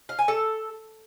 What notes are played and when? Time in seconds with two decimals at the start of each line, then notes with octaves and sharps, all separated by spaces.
0.09 F5
0.19 G#5
0.28 A4